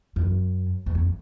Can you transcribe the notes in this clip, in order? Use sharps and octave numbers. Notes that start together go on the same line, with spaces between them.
F#2
E2
F2